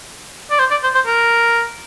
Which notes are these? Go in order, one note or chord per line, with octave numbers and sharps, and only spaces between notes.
D5
C5
D5
C5
C5
A#4